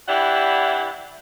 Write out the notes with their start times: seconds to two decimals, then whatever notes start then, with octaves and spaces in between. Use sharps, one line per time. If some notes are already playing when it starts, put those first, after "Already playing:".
0.08 E3 D4 E4 G4 F#5